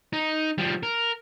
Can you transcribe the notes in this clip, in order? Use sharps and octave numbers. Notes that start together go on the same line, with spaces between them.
D#4
F3 G3
A#4